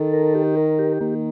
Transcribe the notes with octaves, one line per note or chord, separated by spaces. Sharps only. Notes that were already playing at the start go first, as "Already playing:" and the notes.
Already playing: D#3 A4
A#4
G4
A#4
G4
D#3 A#3